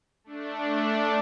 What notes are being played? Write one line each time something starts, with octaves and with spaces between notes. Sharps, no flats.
A3 D4